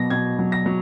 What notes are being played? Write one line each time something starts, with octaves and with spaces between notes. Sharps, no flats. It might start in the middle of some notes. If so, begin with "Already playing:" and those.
Already playing: B2 F#3 A#6
B2 G#6
F#3
A#6
F#3